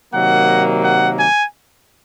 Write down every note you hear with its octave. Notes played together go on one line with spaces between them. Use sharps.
C3 D#3 F#3 A#3 F#5
F#5
G#5